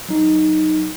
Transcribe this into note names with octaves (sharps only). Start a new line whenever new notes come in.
F#3 D#4